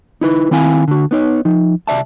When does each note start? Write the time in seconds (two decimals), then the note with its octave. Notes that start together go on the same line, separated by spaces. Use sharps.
0.21 D#4 E4 B4
0.51 D#3 C4 E4 F5 G#5
0.88 D3 F#4
1.11 B3 D#4 C#5
1.45 F3 D#4
1.87 C2 D5 E5 A5